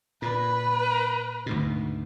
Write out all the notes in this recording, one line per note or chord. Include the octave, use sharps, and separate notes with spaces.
A#2 B4
D2 G#2 B2